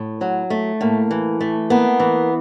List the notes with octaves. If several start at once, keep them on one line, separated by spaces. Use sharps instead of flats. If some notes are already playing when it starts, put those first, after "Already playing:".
Already playing: A2
F#3
A3
A2 A#3
E3
A3
A#3 B3
E3